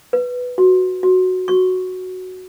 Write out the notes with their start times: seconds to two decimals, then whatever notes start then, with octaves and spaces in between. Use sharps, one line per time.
0.13 B4
0.58 F#4
1.03 F#4
1.48 F#4 C#6